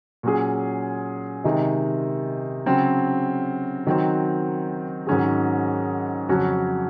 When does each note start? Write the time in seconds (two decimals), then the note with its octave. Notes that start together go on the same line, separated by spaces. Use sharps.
0.23 A#2 F#3 C#4 G#4
1.44 C3 D#3 G#3
2.66 C#3 F#3 C4
3.87 D#3 F#3 C4 F#4
5.07 G#2 D#3 F#3 C#4 G#4
6.29 F2 C#3 F#3 C#4 F#4